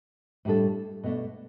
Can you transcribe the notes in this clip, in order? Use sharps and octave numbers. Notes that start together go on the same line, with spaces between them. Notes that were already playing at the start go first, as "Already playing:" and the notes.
A2 G3 D4 A4
B2 A3 D4